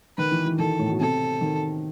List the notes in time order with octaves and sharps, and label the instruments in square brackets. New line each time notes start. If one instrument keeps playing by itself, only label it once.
[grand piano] D#3 [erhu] B4
[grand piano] E3
E3
[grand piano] D#3 [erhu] A4
[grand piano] A2
B2
[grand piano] C3 [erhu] A4
[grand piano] D#3